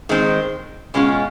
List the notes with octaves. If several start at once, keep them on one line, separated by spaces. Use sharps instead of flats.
D#3 G#3 C4
B2 G#3 C#4 F4